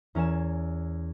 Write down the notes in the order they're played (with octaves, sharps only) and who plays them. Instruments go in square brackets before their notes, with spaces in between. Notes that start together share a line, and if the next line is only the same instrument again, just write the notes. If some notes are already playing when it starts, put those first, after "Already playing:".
[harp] E2 C#4 A#4 G#5 E7